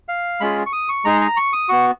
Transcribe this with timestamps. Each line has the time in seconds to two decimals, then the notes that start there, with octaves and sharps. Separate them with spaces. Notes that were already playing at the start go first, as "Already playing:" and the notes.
0.08 F5
0.41 G#3 C#4 F4 G#4 B5
0.66 C#6
0.73 D#6
0.89 C#6
1.05 G#3 D#4 G#4 A#5
1.21 A#5
1.37 C#6
1.53 D#6
1.69 B3 F#4 C#6